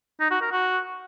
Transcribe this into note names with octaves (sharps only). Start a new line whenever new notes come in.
D#4
F#4
A#4
F#4